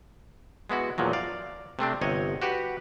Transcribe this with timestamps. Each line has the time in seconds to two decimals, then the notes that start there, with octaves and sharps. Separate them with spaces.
0.70 G#3 B3 E4 F#4
0.98 E2 A#2 F3 F#3
1.13 D5 F5
1.79 C3 A3 C4 D4
2.01 G1 C3 C#5 D#5
2.42 F#4 G4 B4 F#5